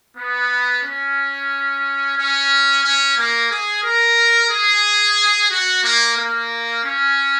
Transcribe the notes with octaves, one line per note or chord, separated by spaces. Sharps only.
B3
C#4
C#4
C#4
A#3
G#4
A#4
G#4
F#4
A#3
A#3
C#4